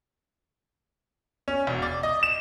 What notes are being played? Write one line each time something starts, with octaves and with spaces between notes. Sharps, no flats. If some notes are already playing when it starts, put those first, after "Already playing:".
C#4
E1
D5
D#5
E7